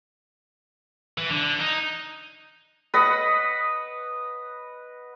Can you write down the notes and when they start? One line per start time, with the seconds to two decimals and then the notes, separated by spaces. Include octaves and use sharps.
1.18 E3
1.31 D3
1.60 D#4
2.94 B4 D#5 F#5